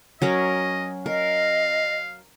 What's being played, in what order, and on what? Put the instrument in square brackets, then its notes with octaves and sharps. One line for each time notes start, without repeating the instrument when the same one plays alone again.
[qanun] F#3 C#4 A#4 [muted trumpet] D#5
[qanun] A#4 [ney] D#5 [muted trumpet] F5